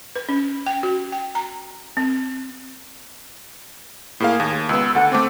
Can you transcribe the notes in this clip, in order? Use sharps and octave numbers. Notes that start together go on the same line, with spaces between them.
B4
C#4
G5
F#4
G5
A#5
C4
A2 A#3 G#4 F5
D#2
C#2 B3 E6
D2 A4 F#5
A3 C4 D6